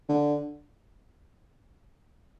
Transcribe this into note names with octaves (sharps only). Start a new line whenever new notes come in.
D3